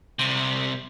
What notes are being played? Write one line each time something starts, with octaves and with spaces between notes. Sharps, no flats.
C2 C3